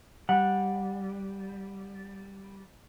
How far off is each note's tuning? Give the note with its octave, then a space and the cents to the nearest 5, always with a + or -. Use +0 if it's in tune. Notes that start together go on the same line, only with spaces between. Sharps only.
G3 +0 F#5 -15